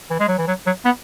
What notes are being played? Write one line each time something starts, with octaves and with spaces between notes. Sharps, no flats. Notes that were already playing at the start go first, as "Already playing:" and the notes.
E3
G#3
F#3
E3
F#3
F#3
B3